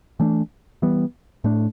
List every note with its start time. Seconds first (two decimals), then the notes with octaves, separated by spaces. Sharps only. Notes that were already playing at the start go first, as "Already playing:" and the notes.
0.20 E3 A3 D4
0.82 E3 G3 B3
1.44 A2 A3 D4